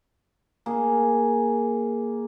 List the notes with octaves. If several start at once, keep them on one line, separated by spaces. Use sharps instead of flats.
A#3 G#4